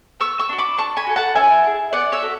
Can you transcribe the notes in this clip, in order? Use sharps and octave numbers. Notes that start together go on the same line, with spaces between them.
B3 C#6 E6
C#6 E6
D4 F#4
B5 D6
D4 A5 C#6
G#5 B5
F#4 A4
F#5 A5
C#4 E5 G#5
E4 G#4
B3 D5 F#5
C#5 E5
F#4 A4